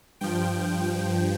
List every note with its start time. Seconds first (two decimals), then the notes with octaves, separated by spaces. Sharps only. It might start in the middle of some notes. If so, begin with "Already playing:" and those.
0.21 G2 F3 G5
0.84 G5